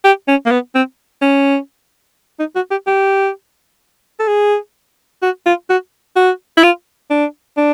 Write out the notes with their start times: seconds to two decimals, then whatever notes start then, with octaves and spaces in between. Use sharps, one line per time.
0.05 G4
0.28 C#4
0.46 A#3
0.51 B3
0.75 C4
1.22 C#4
2.39 D#4
2.56 F#4
2.71 G4
2.87 G4
4.20 A4
4.28 G#4
5.22 F#4
5.46 F4
5.70 F#4
6.16 F#4
6.57 E4
6.64 F4
7.10 D4
7.57 D4